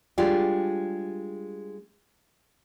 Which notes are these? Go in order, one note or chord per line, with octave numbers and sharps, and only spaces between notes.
G3 G#3 D4 F4 G4